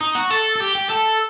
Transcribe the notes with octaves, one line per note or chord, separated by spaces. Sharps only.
D#4
F#4
A4
A4
G4
G4
A4